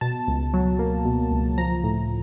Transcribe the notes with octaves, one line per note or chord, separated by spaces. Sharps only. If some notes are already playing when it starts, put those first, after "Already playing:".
B2 A5
C#2
F#3
A#3
B2
C#2
F3 A#5
A2